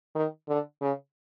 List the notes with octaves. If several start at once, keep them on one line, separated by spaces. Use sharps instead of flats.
D#3
D3
C#3